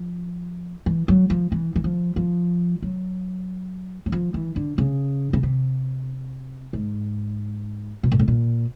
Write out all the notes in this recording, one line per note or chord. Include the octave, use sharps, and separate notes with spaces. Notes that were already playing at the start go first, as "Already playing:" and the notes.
Already playing: F3
E3
F#3
F3
E3
E3
F3
F3
F#3
F#3
F3
E3
D3
C#3
C#3
C3
G#2
B2
A#2
A2
A#2